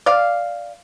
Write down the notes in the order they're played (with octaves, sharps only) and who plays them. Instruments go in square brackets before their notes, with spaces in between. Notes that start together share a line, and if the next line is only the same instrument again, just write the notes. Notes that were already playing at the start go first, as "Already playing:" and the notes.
[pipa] D5 F5